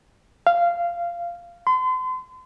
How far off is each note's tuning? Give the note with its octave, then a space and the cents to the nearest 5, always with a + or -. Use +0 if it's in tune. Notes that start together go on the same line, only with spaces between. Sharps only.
F5 -15
C6 -40